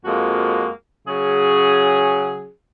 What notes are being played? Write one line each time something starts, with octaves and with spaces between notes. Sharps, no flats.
F2 F3 G#3 A#3 F#4
C#3 F#3 C#4 G#4